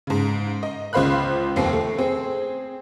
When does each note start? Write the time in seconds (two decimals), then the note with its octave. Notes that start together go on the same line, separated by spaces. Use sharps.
0.07 G#2 C#3
0.63 D#5
0.93 C#2 C#3 C5 F5 B5 F#6
1.56 F1 D#2 C4 C7
1.73 A3
1.99 C4 G#4